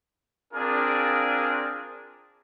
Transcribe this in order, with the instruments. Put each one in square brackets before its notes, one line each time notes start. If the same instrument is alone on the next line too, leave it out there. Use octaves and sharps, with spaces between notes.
[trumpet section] C4 D4 F4 G#4 A#4 D5